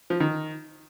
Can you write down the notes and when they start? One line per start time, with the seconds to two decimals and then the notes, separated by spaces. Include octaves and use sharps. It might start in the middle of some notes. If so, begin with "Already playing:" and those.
0.10 F3
0.20 D#3